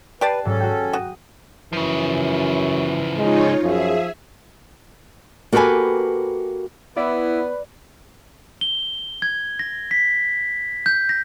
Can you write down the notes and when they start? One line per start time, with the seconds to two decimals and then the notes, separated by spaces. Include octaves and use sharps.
0.21 G4 B4 D5 A5 F#6 C7
0.45 G#2 F#3 C#4 A4
0.60 F#4 G#4 G5
0.93 F#4 D#6
1.73 F#2 C#3 E3 F3
3.18 G#3 D#4 F4 C#5
3.63 F#2 F3 G#4 E5
5.53 A#3 F#4 G4 A4 B4 G#5
6.96 B3 E4 B4 D5
8.61 G7
9.22 G#6
9.59 A#6
9.91 B6
10.86 G6
11.09 A#6